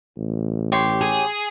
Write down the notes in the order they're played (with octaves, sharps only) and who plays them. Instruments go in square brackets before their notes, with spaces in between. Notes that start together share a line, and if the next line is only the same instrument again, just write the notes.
[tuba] A1
[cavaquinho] G4 C#5 C6
[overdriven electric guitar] G#4